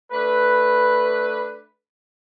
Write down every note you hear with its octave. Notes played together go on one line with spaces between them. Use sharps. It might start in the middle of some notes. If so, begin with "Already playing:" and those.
A3 D4 B4